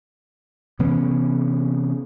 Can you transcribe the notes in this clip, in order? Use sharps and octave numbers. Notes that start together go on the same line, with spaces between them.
C3 E3 B3 C#4